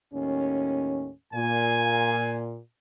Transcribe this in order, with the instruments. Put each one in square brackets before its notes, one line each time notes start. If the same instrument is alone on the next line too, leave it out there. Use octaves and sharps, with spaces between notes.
[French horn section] D#2 A2 C#4
[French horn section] A#2 [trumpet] G#5